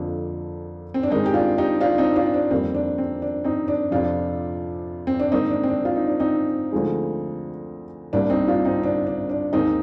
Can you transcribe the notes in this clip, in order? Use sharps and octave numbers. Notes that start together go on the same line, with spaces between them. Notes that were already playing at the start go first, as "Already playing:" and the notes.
Already playing: F2 D3 F3 A#3 D4
C4
D4
G#2 D#3 G#3 C4 D#4
G4
D4 F4
D#4 G4
D4 F4
C4 D#4
D4 F4
D4
F2 D#3 G3 A#3 C4
D4
C4
D4
C4 D#4
D4
F2 C3 F3 D4 F4
C4
D4
G#2 D#3 A#3 C4 D#4
D4
C4
D4
F4
D#4
D4
C4 D#4
D2 D3 F3 G#3
C2 C3 G3 A#3 D4
C4 D#4
D4 F4
C4 D#4
D4
D4
D4
D#2 D#3 G#3 C4 D#4